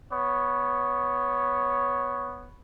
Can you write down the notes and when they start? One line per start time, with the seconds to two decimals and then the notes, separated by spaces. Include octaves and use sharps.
0.11 B3 C#5